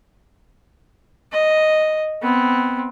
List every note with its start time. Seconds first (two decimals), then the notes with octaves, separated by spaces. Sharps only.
1.32 D#5
2.22 B3 C4